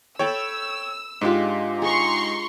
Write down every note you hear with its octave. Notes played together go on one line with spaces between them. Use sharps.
A4 C#5 G5 A5 B5 E6
G#2 G#3 D4 F4 G4
G#4 A#5 C6 C#6